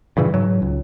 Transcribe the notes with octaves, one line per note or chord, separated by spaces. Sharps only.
G2 A#2 C#3 E3
G#2 F#3
C#2